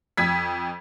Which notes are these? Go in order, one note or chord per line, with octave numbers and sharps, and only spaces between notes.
F2 G#6 B6